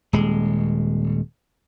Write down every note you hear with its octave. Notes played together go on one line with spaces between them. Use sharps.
D#1 G#3